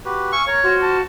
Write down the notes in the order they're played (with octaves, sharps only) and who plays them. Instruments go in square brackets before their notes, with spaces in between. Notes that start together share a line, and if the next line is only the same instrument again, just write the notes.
[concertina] F#4 G4 B4
[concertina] F5 G#5 E6 [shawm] C#6
[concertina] A#4 [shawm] C#5
[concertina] F4 C5 [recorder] F#4
[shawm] A5